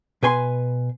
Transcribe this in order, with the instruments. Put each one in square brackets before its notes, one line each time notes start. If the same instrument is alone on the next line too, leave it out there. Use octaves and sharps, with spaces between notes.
[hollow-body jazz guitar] B2 B4 G#5 C6